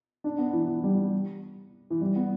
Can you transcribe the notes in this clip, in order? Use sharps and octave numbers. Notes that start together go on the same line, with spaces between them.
D4
B3
E3
E3
G3
E3
G3
B3